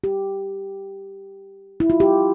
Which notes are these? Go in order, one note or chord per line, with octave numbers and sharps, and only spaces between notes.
G4
E4
F4
G4